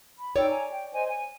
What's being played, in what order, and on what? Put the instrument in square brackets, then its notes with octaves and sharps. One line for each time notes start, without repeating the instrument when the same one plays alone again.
[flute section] B5
[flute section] D#4 G5 E6 [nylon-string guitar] C#5 D5
[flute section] G#5 A#5
G5
C5 D#5 G#5
G#5